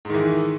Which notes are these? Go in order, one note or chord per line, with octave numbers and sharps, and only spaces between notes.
G#2 D#3 E3